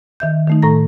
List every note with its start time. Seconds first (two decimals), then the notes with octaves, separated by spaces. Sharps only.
0.20 D#3 E5 G6
0.47 D#3 A3 D#4
0.62 A2 A3 A4 A#5 A#6